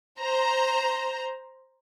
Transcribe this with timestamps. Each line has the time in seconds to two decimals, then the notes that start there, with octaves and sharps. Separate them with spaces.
0.19 C5 A#5